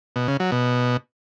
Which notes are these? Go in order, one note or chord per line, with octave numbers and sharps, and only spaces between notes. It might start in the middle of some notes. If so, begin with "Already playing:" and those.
B2
C#3
F#3
B2